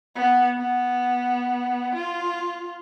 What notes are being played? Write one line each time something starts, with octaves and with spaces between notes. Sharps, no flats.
B3
B3
F4